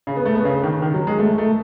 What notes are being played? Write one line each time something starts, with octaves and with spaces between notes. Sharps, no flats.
C#3
B3
A3
B3
C#3
D#3
D#3
F#3
G#3
A3
A3